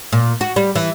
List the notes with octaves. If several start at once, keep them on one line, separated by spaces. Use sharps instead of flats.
A#2
F#4
G3
E3